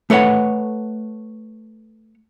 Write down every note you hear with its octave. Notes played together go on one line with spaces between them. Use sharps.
A3 A4 B4 C#5 F#5